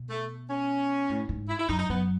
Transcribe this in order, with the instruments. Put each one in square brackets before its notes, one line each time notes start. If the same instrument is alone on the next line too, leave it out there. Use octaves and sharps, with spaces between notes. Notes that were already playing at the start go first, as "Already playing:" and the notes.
Already playing: [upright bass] B2
[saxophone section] A3
C#4
[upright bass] A2
G#2
[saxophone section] E4
E4
[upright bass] F#2 [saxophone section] D#4
[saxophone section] D#4
[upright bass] F#2 [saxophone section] B3